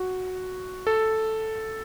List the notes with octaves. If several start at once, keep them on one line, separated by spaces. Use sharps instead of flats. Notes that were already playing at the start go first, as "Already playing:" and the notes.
Already playing: F#4
A4